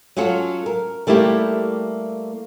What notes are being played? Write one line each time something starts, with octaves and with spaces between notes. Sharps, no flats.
F#3 C#4 F4 F#4 A4
A#4
G3 A3 A#3 E4 G4